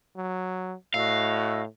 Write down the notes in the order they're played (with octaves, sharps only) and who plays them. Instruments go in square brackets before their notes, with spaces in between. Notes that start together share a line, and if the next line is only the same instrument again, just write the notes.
[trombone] F#3
[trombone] A2 [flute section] F#4 D#5 E6 [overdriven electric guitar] F5